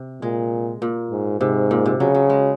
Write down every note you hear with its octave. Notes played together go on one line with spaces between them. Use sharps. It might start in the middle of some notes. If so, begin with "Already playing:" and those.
Already playing: C3
A#2 G#3
A#2
G#2
G#2 C3
A#2
C3
C#3 F#3
F#3
G#3